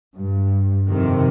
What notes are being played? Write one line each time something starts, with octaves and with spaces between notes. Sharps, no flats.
G2
F2 C3 D#3